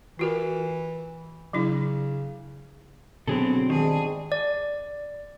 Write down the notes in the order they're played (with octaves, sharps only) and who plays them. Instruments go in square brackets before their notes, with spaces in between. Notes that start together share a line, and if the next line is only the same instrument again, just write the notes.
[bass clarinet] E3 [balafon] F4 F#4 A#4
[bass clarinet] C#3 [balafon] F#3 D4 E4
[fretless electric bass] B2 D3 F#3 [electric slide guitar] B3 G#4 A4 [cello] C4
[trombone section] G#2 G3 D4 [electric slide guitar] D#3 [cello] G#4
[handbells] D5